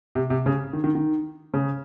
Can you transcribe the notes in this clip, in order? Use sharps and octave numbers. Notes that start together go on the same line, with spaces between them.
C3
C3
C#3
D#3
D#3
D#3
C#3